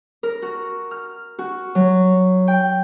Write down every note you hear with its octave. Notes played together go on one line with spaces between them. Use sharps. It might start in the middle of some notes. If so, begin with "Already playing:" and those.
A#4
F#4
F6
F#4
F#3
G5